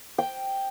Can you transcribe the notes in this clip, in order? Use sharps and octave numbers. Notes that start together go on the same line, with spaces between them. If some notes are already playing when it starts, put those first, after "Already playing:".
G5